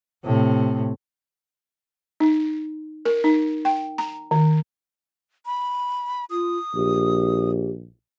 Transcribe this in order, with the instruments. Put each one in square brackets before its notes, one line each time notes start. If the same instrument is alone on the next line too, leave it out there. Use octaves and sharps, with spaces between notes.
[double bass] A2 C3
[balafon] D#4
A#4
D#4
G5
A#5
D#3
[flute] B5
[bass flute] F4 [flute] D#6
[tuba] A#1 [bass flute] G4